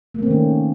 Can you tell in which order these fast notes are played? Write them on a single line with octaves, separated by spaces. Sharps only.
A#3 A3 C4 D#3 C#4